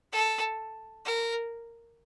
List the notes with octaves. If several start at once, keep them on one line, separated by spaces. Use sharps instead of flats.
A4
A#4